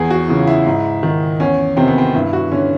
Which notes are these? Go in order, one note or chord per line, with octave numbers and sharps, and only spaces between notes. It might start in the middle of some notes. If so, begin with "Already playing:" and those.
Already playing: E2 G#4
F#4
C#3 E3 F4
E4
G#2
D#3
E2 C#4
C3 D#3 C4
B3
C4
G2 E4
F#4
D3 C#4